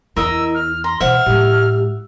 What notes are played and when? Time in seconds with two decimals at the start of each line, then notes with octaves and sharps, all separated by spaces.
0.16 E2 E4 A#4 D#5 A#5 E6
0.54 F6
0.84 A#5 C6
1.00 B2 E3 C5 E5 F#5 F6
1.26 A2 G#3 G4